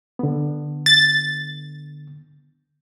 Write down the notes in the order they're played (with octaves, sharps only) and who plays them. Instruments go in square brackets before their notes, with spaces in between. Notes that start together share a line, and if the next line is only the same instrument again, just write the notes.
[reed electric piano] D3 B3
[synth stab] A6